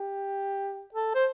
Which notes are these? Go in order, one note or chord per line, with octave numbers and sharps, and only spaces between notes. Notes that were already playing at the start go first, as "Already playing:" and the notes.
Already playing: G4
A4
C5